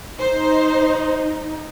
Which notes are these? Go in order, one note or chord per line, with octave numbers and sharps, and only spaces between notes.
D#4 C5